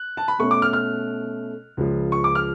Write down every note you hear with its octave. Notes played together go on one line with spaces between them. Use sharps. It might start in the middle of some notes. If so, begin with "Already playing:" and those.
Already playing: F#6
A5
B5
B2 A3 C#4 C#6
D6
F6
F6
C#2 C#3 F3
C#6
D6
F6